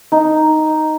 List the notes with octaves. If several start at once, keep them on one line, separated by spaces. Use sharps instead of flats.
D#4